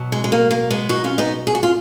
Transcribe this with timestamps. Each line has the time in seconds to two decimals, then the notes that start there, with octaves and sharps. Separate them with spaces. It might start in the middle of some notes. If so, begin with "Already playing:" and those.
Already playing: B2 F#3
0.12 G#3
0.24 G#3
0.32 A#3
0.51 A#3
0.70 G#3 B3
0.89 D#4 F#4
1.04 C#4 F4
1.18 B3 D#4
1.47 G#4
1.55 F#4
1.63 F4